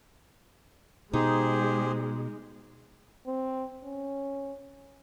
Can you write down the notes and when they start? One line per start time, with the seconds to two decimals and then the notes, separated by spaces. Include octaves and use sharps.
1.13 B2 G#3 D#4 G4 G#4 C5
3.27 C4
3.84 C#4